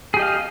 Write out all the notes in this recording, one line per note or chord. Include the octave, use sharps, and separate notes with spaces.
G4 G#4 D#5 F5